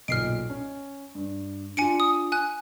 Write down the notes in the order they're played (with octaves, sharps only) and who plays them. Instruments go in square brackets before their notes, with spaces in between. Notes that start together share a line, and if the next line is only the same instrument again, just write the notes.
[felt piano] B1 A#2 [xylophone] F6 C7 D7
[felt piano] C#4
G2
[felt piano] D4 F4 [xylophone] G#5 C#7 D7
[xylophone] D#6
G#5 F#6